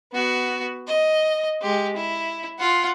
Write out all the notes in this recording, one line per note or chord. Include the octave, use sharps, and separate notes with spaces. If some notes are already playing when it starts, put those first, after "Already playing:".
B3 F#4
D#5
G#3 G4
E4
F4 F#5